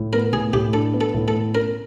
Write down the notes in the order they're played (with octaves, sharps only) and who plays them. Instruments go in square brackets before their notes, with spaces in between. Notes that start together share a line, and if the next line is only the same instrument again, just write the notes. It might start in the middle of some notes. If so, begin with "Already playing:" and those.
Already playing: [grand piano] A2
[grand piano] B3 [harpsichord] A#4
[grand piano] A2 [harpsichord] G#4
[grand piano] A2 [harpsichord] G4
[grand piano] D4 [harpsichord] A4
[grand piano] B3
[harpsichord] A4
[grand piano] A2
[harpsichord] A4
[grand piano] B3
[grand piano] C#4 [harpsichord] A#4